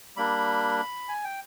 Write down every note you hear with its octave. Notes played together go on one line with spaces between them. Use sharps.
G3 A#3 D4 B5
G#5
G5